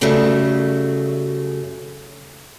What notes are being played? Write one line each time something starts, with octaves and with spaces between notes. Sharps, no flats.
F#2 C#3 F#3 G3 A3